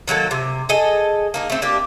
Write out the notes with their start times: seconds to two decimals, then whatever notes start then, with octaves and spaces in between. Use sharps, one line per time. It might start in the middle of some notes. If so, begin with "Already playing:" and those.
0.08 D#3 F#3 A#3 A4
0.31 C3
0.69 G#4 A4 D#5
1.34 A#3 D#4 G#4
1.50 A3 C4
1.62 A#3 D4 G4